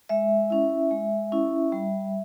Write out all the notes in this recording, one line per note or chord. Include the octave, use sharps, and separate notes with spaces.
G#3 E5
C#4 E4
G#3
C#4 E4
G3